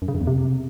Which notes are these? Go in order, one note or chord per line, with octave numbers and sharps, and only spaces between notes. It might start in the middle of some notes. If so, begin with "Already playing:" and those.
F#2
C#3
F#2
E2
C3